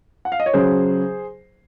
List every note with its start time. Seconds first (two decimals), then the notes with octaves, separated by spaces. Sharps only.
0.25 F#5
0.32 F5
0.40 D#5
0.46 C#5
0.53 C#3 F#3 G#4 C5